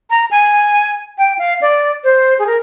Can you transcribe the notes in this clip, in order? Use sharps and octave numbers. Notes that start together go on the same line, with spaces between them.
A#5
G#5
G5
F5
D5
C5
G#4
A#4